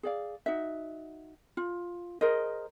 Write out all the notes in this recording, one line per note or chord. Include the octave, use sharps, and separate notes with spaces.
G#4 D5 F5
D#4 F#4 E5
F4
G#4 A#4 C5 D#5